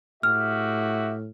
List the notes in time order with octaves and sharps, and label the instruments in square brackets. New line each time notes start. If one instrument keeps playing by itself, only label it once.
[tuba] A2 [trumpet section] F#4 G4 E5 [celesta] F6